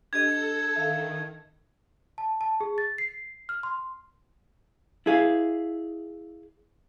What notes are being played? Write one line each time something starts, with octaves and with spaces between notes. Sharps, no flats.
D4 G4 A4 D#5 G#6
D#3 E5 F5
A5
A5
G#4
A6
C7
F6
C6
E4 G#4 F5